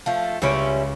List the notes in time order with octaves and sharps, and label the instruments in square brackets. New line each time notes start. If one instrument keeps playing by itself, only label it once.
[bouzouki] F3 A3
[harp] C#2 C#5 D7 [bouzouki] G3 C#4 E4